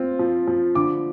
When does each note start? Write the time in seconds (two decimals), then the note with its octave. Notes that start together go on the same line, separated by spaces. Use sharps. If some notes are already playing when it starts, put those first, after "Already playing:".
Already playing: C4 F4
0.19 F3
0.47 F3
0.75 D3 D6